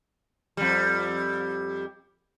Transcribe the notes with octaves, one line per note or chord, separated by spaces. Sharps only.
F2 G3